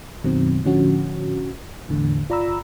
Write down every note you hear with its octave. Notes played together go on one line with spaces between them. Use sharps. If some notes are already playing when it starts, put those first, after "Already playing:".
F#2 B2 D#3 F#3 C4
A2 D3 F3 C#4 F#4
E2 A2 D3
G1 F4 D5 A#5 B5 E6